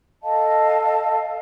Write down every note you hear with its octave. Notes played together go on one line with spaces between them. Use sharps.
A4 D#5 F5 A5